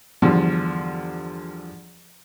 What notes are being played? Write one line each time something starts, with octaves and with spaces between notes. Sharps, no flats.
E2 G2 D3 F3